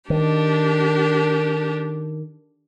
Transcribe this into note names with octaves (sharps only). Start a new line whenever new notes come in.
D#3 D4 G4 A4